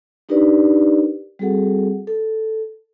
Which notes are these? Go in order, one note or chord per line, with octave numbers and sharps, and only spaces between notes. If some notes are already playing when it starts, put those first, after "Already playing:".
D4 D#4 G4 A#4 B4 D5
G3 C4 F#4 G#4 A4 F#5
A4